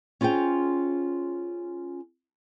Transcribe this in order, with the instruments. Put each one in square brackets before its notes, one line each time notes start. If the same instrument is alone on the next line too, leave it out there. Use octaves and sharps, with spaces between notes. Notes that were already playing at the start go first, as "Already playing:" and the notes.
[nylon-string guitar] C#4 F4 G#4 C5 G5